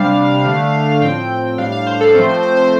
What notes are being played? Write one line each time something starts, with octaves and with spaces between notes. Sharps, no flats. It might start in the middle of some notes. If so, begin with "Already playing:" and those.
Already playing: C3 G3 D4 F5
D3 A3 D4
A2 F3 C4 G5
A2 G3 D4 F5
F5
C5
A4
F3 A3 C4 C5
C5
C5
C5